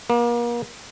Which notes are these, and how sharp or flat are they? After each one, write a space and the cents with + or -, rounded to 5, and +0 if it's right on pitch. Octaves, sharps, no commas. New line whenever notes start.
A#3 +35